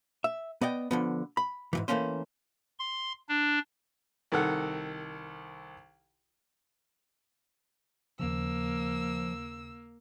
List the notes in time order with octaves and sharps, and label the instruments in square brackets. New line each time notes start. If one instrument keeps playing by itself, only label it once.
[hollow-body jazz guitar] E5
B3 D5 D#5 G5
D3 F3 B3
B5
G#2 D#3 E3
E3 A3 A#3 C#4 C5
[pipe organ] C6
D4
[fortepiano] C2 D#3 A4 F#5
[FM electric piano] D#2 C#3 [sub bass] F3 [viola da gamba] A#3 [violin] E6